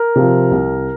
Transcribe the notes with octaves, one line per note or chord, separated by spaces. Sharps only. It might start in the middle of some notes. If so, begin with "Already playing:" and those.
Already playing: A#4
C3 F3
C2